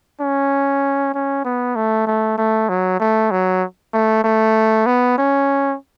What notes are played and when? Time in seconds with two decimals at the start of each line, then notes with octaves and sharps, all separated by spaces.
0.21 C#4
1.14 C#4
1.45 B3
1.76 A3
2.07 A3
2.38 A3
2.69 F#3
3.00 A3
3.31 F#3
3.93 A3
4.24 A3
4.86 B3
5.18 C#4